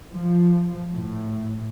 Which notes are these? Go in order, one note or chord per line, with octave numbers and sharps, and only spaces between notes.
F3
A2